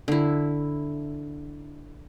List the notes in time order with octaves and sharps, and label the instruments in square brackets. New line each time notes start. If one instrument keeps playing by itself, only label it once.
[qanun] D3 E4